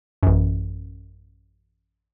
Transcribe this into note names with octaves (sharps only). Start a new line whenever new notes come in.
A1 F#2